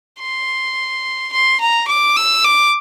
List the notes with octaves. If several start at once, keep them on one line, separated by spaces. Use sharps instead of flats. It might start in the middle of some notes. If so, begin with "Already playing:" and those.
C6
C6
A#5
D6
E6
D6